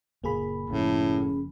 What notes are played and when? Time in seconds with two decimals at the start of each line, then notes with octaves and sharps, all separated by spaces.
0.24 F#1 A#2 A#3 G#4 B5
0.70 F#1 A2 F3 C#4